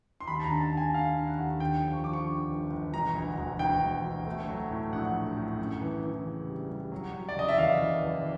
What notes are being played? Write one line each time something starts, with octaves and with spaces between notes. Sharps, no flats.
C6
D#2 B5
A5
A#5
D3
A5
D3
G#5
D3 F5
D3
F#5
D#2
D3 G5
F3
C#6
F3 D6
C#6
D3
G1
G1
E1 A#5
D2
E1
D2 G5
E1
D2
A3
F#3
A2
A#1 F#5
A3
A2
F#2
E3
E3
C#3
G3
G3
F#3
F#3
D5
F#1 D#5
E5
E2 F5
F#1
E2